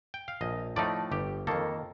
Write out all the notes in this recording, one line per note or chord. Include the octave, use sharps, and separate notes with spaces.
G5
F5
A#1 D#5
A2 F3 A3 D#4 D5
G1 G4
F2 D#3 A#3 A4